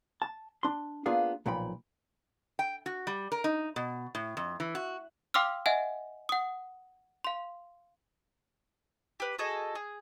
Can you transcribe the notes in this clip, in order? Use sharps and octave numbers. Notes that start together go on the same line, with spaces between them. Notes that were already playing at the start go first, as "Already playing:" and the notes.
A5
D4 C6
A#3 B3 D4 F4 G#4 F5
B1 A#2 F3 G5 B5
G5
F#4
G3
A#4
D#4
B2
A2
F2
E3
F#4
F5 G5 C6 D6 E6 F6
D#5 E5 F#5 G#5
F#5 D#6
F5 C6
G4 B4
F#4 G#4 A4 D#5
G#4